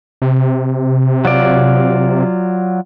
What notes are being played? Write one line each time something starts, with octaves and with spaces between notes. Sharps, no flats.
C3
F#3 F4 D5